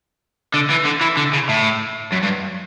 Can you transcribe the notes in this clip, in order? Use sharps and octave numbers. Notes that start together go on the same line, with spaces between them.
D3
E3
D3
E3
D3
C#3
A2
F#2
G2